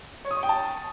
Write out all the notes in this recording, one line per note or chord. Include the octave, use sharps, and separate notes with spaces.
C#5
D#6
C#6
G5
A5